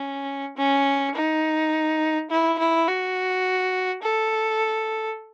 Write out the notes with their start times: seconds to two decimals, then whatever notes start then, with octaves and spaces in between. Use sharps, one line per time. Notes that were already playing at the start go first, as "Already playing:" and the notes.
Already playing: C#4
0.57 C#4
1.15 D#4
2.31 E4
2.59 E4
2.88 F#4
4.03 A4